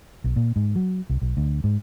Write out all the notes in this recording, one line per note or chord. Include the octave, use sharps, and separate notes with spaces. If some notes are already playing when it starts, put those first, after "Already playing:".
B1
A#2
G#2
F#3
C2
B1
D2
G#2